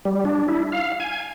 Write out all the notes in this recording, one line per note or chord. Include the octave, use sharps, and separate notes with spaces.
G3
D4
E4
F5
G#5